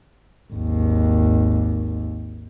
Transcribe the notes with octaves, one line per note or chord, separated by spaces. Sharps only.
G#1 D#2